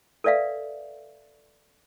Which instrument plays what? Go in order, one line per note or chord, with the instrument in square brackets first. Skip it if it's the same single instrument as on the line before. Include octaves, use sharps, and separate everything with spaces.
[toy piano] A4 B4 D5 E5 F5